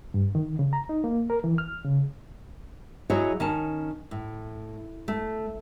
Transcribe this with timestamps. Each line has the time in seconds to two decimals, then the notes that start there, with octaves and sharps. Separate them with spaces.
0.14 G2
0.35 D#3
0.59 C#3
0.73 A#5
0.89 D#4
1.04 A#3
1.30 A#4
1.44 E3
1.58 F6
1.85 C#3
3.10 F#3 E4 F#4 G#4 C#5 D#5
3.40 D#3 C#4 A5
4.11 A2
5.08 A3